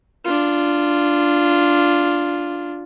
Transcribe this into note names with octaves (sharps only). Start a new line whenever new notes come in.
D4 F4